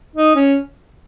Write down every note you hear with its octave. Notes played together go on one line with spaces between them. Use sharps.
D#4
C#4